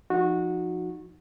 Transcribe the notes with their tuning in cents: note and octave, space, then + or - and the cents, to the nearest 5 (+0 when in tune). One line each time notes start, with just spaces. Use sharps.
F3 +0 D#4 +0 F#4 -15